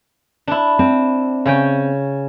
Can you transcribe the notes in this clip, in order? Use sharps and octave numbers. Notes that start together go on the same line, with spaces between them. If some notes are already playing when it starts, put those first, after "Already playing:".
D4 E4
C4
C#3 C#4 G5